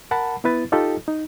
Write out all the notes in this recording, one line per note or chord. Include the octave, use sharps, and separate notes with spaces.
A#4 F#5 A5 B5
B3 E4 B4 A6
D#4 F4 G4 A4 D#5
D#4